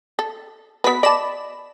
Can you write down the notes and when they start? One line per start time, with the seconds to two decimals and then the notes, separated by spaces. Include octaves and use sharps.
0.19 A4
0.84 B3 F#4 B4 B6
1.03 D5 D#5 A5 B5 E7